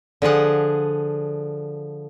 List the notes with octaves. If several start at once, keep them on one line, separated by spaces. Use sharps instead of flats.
D3 F3 G#4 F#5